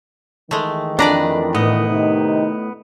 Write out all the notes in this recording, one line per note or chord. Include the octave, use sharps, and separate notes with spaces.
D#3 E3 G#3 A3
F2 D4 B4 D5 A#5
A2 B3 D#5
C3 D#3 D#4